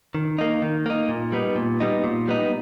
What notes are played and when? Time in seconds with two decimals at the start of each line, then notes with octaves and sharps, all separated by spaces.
0.15 D#3
0.38 A#3 D#4
0.62 D#3
0.86 A#3 D#4
1.09 A#2
1.32 G3 B3 D#4
1.56 A#2
1.80 G3 B3 D#4
2.04 A#2
2.28 G3 B3 D#4